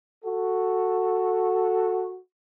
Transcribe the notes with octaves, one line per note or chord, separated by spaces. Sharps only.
F#4 A4